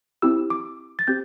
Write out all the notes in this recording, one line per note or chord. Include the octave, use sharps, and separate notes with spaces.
C4 E4 G4 E6
D6
A6
C4 G4 G6